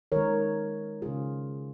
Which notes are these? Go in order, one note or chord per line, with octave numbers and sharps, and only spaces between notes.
D#3 G#3 A#4 C#5
C#3 G#3 F4 G#4